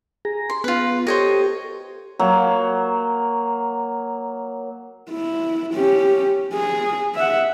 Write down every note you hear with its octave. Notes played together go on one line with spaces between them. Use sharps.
G#4 A#5
C6
B3 F4 B4
G4 A4 C5 C#5 D#5
F#3 A#3
E4
C#4 G4
G#4
E5 F#5